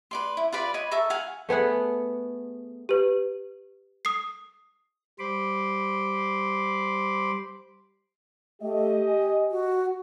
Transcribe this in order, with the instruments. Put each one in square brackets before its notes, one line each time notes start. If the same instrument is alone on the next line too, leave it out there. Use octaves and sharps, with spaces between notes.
[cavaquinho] B4 D5 C6
E4
F4 B4 D5 B5
C#5 D#5 F#5 B5
A4 A#4 E5 C#6
F5 F#5 G#5
[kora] A3 B3 G#4 F#5
[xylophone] G4 B4
D#6 C7
[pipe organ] G3 C5 B5 C6 D6
[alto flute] A3 [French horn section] G4 D#5
[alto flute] G#5
F#4